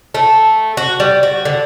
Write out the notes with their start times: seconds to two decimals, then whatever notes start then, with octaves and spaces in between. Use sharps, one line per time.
0.14 A3
0.77 F#4
1.00 G3
1.23 F#4
1.45 D3